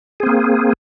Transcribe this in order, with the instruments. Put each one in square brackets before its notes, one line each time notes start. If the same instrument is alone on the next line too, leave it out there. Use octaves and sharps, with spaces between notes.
[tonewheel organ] G#4
C4
A#3